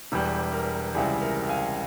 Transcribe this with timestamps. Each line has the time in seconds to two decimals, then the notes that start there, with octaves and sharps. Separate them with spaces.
0.12 E1 E2 E3 G3
0.53 A#4
0.95 C#2 C3 E3 G3 G#4
1.22 A#4
1.49 F5 G#5